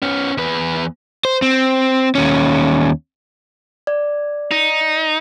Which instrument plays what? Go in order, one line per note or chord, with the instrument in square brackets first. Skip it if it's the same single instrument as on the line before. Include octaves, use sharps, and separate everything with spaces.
[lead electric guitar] B3 C#4
E2 B4
[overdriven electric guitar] C5
C4
D#2 C#4
[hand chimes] D5
[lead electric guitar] D#4